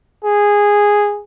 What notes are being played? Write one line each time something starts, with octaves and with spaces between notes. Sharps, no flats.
G#4